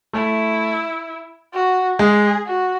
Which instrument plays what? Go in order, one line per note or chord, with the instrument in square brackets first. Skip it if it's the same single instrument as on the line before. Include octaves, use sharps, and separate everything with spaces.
[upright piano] A3 [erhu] E4
[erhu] F#4
[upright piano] G#3 [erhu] G#4
[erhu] F#4